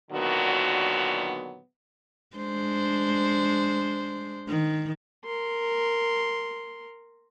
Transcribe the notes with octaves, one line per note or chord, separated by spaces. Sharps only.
A#2 D3 D#3 F#3 B3 F#4
G#3 D4 C5
D#3
A#4 C6